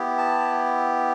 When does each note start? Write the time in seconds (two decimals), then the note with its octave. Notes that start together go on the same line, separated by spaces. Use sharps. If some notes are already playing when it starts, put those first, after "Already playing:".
Already playing: B3 E4 G4
0.18 A5